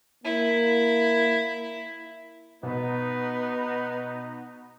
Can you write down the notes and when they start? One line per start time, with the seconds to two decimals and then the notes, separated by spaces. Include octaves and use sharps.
0.24 A#3 E4
2.63 B2 B3 D#4 B4